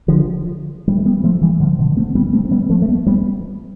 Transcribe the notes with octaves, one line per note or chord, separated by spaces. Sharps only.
D3 F3
G3
A3
G3 B3
F3 A3
E3 G3
D3 F3
B2 D3
A3 C4
G3 B3
A3 C4
C4
G3 B3
F3 A3
A3
G3 B3
G3 B3